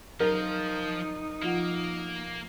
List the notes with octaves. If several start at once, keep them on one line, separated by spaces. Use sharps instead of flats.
F3 F#3 D#4 A#4
F3 A#3 F4 F#5